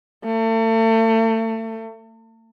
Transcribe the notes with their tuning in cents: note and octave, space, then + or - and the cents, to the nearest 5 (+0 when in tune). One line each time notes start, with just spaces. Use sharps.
A3 +35